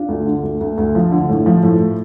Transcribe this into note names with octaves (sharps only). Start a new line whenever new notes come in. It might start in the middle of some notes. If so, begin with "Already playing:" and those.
Already playing: D4 F4
D2
D3
D2
D2
D2
F3
D3
A2
F3
A2